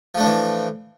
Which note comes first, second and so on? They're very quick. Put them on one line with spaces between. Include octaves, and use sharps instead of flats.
F3 A3 D4 A2 E3